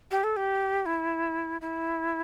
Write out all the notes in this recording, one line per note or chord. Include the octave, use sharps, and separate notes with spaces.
G4
A4
G4
E4
E4